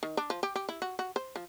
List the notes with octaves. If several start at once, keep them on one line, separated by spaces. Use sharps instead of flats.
D#3
D4
F3
G4
G4
E4
F#4
F#4
C5
F3